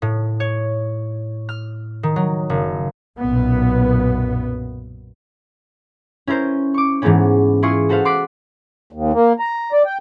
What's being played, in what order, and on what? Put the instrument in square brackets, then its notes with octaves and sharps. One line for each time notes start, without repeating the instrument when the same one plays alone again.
[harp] A2
C#5
F6
D#3
F#3
F#1
[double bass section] B1 F#2 A#2 B3
[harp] C#4 E4 A#4 C5
C#6 D6
G#2 E3 G#3 A3 B3 C#4
E4 F4 G#4 C6 C#6 D#6
F#4 A4 B4 C5 F5
C6 D6 F#6 B6
[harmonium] D#2
A#3
A#5
D5
G5